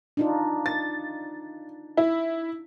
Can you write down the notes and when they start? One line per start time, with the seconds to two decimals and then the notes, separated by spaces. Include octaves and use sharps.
0.17 D4 D#4 F4
0.66 A6
1.97 E4